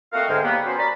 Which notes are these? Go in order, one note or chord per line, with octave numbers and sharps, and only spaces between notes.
A3 A#3 C4 F#4 D#5 F5
C#2 G#2 D3 G#3 F5 G5
F#3 G3 A#3 B3
B3 C#4 F#4 C5
A#4 C#5 D5 B5